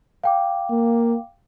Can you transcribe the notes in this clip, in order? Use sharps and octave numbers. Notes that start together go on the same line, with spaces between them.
F5 G5 D6
A#3